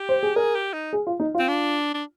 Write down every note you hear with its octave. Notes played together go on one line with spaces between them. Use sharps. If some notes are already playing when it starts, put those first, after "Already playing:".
Already playing: G4
C5
G#4
G#4 A#4
G4
D#4
G#4
F4
D#4
C4 F4
D4
D4